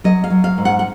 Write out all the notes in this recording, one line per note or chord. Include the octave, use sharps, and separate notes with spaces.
F#3 D#5
F5
F#3
F5
G#2
F#5
F#5